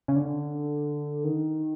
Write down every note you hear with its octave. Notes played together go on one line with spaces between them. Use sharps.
C#3
D3
D#3